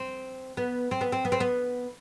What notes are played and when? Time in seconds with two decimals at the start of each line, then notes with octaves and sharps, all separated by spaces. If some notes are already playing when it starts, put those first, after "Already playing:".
Already playing: C4
0.57 B3
0.91 C4
1.01 B3
1.12 C4
1.25 B3
1.32 C4
1.40 B3